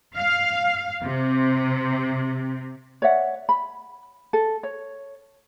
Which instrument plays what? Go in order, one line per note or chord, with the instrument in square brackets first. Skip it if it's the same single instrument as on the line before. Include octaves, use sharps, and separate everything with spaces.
[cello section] F5
C3
[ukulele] C#5 D5 E5 F#5
B5
A4
C#5